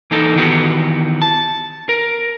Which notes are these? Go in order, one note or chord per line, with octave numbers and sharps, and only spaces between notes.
E3 A#3 D#4 A4
D#3 E3 B3 F#4 G4
A5
A#4